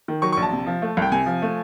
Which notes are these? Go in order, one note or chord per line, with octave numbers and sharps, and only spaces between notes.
D#3
F#3 C#6
A#1 C#6
A5
C3
F3
A3
C2 G5
C3 G#5
F3
A3